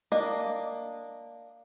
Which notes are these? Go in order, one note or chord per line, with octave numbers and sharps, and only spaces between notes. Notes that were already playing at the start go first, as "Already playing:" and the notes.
A#3 D4 D#5